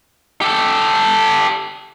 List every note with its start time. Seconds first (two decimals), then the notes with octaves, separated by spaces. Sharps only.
0.41 G4 A4